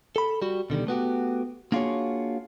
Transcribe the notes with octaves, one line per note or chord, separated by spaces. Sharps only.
A4 B5
G3 F#4
B2 D3 D#3 G3
A3 B3 F#4 G4
A#3 D4 F4 F#4 G#4 C#5